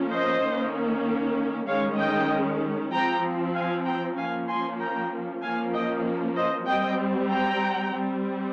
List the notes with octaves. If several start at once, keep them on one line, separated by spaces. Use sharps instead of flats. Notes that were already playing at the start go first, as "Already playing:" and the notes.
Already playing: F3 A#3 C#4
C5 D#5
D#3 A#3 C#4
D#3 G#3 C#4 C#5 F5
D#5 G5
F3 C4 G5 A#5
F5 G#5
G5 A#5
F3 A#3 C#4 F5 G#5
G#5 C6
G5 A#5
F3 A#3 C#4 F5 G#5
D#5 G5
C5 D#5
G3 C4 D#5 G5
G5 A#5
G3 C4